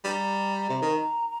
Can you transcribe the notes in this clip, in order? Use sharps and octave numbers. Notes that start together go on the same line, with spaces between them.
G3 A#5
C3
D#3